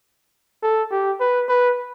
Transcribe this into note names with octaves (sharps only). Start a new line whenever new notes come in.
A4
G4
B4
B4